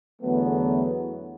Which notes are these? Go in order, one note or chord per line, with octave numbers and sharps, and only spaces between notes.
E2 D3 F#3 A3 B3